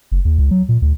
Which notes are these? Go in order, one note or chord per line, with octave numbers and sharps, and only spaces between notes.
F#1
D#2
C#2
F#3
A#2
D2